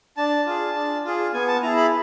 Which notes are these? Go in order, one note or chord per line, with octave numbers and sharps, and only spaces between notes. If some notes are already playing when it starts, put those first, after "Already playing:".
D4 A5
F4 G#4
D4
F4 G#4
B3 G#5
A5
E4 G#4 A#5
B5